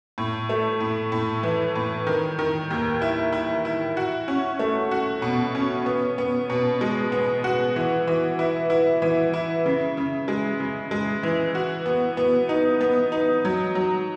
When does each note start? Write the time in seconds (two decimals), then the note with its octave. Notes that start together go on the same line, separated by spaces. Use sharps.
0.18 A2
0.49 A3
0.81 A2
1.12 A2
1.43 E3
1.76 A2
2.07 D#3
2.39 D#3
2.70 D#2
3.02 E4
3.33 E4
3.65 E4
3.97 F#4
4.28 C#4
4.59 A3
4.91 F#4
5.22 B2
5.55 C#4
5.86 B3
6.18 B3
6.50 B2
6.81 G#3
7.12 B3
7.44 F#4
7.76 E3
8.07 E3
8.39 E4
8.70 E4
9.02 E3
9.34 E4
9.66 C#3
9.97 C#3
10.28 G#3
10.60 C#3
10.91 G#3
11.23 E3
11.55 F#4
11.86 B3
12.17 B3
12.49 D#4
12.81 B3
13.12 D#4
13.45 F#3
13.75 F#3